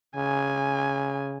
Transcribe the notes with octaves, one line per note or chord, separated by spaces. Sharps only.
C#3 G#5